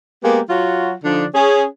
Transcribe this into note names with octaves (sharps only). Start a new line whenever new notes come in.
G#3 A#3 B3 G4
F#3 F4 F#4
D3 F3 D4 D#4
C#4 G#4